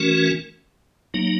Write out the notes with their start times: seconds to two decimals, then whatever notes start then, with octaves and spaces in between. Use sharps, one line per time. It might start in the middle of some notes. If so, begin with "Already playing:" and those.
Already playing: E3 A3 C#4 F#4 A#4
1.14 F#3 A#3 D#4